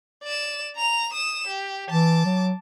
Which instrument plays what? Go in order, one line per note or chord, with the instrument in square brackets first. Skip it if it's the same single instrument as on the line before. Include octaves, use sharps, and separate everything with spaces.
[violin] D5 E7
A#5 F7
D#6 E7
G4
[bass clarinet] E3 [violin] A5 D6
[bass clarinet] F#3